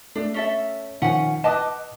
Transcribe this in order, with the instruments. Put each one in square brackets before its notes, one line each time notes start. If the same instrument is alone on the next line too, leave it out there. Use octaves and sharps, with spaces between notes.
[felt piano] A3 [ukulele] D4
[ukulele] C#4 A4 E5
[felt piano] D#3 F3 [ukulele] C#4 F#5 G#5
[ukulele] B4 D#5 A5 [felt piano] F#5 D6 D#6